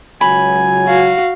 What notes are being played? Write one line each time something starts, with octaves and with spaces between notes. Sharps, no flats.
C#2 F#3 G#5 B5
F#4 F5